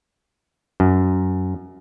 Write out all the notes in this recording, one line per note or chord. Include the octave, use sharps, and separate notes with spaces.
F#2